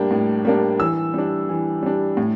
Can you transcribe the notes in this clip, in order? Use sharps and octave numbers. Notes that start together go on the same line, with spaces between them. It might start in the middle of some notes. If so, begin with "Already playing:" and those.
Already playing: A2 G3 A#3 D4 G5
A2
G3 A#3 D4
E3 E6
G3 D4
E3
G3 D4
A2